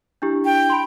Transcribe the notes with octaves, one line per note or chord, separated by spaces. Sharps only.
D4 E4 G4
G5
B5 C6